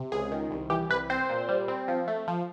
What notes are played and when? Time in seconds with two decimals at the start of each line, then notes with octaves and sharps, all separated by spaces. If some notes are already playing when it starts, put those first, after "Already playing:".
Already playing: C3
0.12 C#2 G#4
0.32 D#3
0.51 C2
0.70 E3 G4
0.90 C2 B4
1.10 C4 C5
1.30 A#2
1.49 G3
1.68 C4
1.88 F3
2.08 A3
2.28 F3